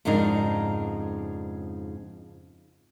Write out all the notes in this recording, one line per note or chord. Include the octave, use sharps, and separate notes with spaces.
F2 G#2 C#3 D4 D#4 A#4